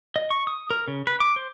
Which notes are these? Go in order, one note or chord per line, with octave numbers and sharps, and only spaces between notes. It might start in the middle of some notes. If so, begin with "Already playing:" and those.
D#5
C#6
D#6
A#4
C#3
B4
D6
C5